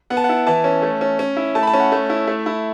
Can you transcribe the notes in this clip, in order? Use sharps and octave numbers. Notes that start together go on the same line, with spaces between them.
B3 F#5
A5
F#5
E4
E3 A5
C#4
A3
C#4
C#4
E4
A3 A5
B5
A5
C#4
F#5
A3
E4
A3
E4